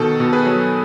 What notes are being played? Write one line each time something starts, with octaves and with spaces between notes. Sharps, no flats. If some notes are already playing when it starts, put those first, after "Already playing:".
Already playing: B2 D#3 A4
B2
G#4 B4
F#3